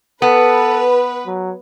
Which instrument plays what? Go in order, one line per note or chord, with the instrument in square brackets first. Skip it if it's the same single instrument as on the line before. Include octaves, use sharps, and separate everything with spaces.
[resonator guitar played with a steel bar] B3 [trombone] A4 [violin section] B4
[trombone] F#3